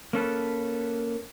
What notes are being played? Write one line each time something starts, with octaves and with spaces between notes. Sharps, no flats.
A#3 C#4 A4 B4